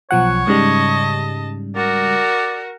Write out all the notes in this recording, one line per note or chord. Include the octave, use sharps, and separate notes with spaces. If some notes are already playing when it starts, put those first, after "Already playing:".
B1 F3 C#5 F#5
G#2 C#3 G3 D#5 A5
F#4 A#4 D5